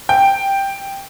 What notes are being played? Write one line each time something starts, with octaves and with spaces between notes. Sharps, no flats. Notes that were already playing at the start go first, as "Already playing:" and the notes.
G5